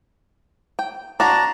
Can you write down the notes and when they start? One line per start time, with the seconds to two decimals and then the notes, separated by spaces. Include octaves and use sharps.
0.79 G5
1.20 D4 F#4 A5 A#5